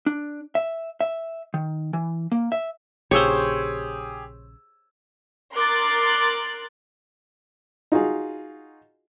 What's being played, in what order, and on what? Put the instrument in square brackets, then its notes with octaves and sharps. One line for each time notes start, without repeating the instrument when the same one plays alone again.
[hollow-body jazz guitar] D4
E5
E5
D#3
E3
A#3
E5
[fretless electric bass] A#1 C#3 [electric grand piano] G4 G#4 E6 [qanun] C5 C#5
[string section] A#4 C6 D6 F#6 A6
[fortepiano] D#4 F4 F#4 G#4